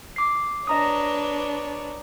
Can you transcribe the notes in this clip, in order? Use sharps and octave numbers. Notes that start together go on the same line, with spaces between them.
D6 C7
D4 B4 C#5 D#5 A#5 D#6